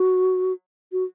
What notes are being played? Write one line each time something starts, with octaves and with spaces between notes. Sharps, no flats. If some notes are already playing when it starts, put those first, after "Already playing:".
Already playing: F#4
F#4